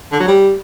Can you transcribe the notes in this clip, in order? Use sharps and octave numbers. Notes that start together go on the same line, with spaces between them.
D3
F#3
G3